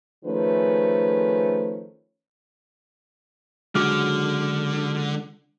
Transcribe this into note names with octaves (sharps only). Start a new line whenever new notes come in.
D#3 F3 A3 C#4 G#4 B4
C#2 D3 F#3 G#3 F#4 D6 F6